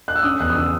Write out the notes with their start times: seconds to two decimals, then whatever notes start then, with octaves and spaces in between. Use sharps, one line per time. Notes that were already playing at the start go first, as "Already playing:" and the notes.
0.08 F#6
0.15 E6
0.23 C#4 D#6
0.40 E2 F#6
0.50 D#6
0.57 C#3 E6